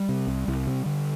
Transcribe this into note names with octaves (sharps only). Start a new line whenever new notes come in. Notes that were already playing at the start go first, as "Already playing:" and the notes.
Already playing: G3
C3
C2
C2
C3
D3